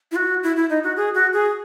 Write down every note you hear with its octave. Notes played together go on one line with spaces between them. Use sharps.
E4
F#4
E4
E4
D#4
F#4
G#4
F#4
G#4